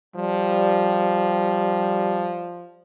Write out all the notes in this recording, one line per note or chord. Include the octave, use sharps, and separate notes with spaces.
F3 G3